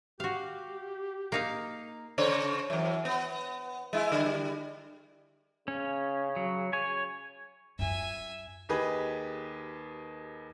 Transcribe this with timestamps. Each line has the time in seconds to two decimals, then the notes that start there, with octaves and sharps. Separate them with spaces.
0.20 F#4 G4 F5
1.32 A#3 D#4 F5
2.18 C#3 C5 C#5
2.70 F#2 E3
3.05 B3
3.93 G#3 E4
4.12 D3 G3
5.68 C#3 C#4
6.36 F#3
6.73 C#5 G#5
7.79 F#2 F4 E5 G#5
8.69 D#2 G4 G#4 B4 D#5